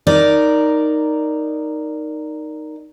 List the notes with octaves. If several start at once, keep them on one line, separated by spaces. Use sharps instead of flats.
D#4 A#4 D5